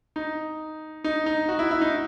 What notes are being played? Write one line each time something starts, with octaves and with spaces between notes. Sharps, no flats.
D#4
D#4
D#4
F#4
E4
E4
D#4